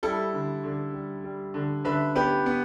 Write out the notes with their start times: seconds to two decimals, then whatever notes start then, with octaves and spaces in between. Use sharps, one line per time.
0.03 G3 E4 A4
0.33 D3
0.64 D3
0.93 G3
1.24 G3
1.54 D3
1.84 D3 B4 E5
2.15 B3 G4 B4
2.46 B3